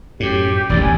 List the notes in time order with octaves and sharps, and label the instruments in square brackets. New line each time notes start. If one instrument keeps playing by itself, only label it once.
[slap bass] F#2 A2 [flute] G4
[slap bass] E1 A1 D#2 [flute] D5
[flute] G#5